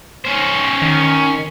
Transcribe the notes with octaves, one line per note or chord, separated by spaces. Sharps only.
C#4 C5
D#3